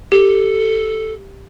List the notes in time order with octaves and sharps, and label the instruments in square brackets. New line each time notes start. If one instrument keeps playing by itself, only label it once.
[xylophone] G4 [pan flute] A4